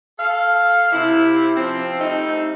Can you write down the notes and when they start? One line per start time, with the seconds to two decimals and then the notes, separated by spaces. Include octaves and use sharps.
0.19 A4 F5
0.93 C3 E4
1.57 F3 C4
2.00 G3 A3 C4 D#4